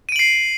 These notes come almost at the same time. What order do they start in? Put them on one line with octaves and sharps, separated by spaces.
D#7 D7 F#7 C7